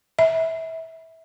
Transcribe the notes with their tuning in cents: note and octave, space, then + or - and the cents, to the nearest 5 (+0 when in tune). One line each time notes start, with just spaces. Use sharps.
E5 -20